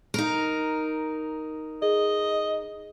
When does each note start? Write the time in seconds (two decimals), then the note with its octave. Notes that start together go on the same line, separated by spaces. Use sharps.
0.14 D#4 A#4
1.82 G#4 D#5